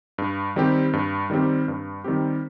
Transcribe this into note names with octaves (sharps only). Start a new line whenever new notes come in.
G2
D#3 G3 C4 G4
G2
D#3 G3 C4 G4
G2
D#3 G3 C4 G4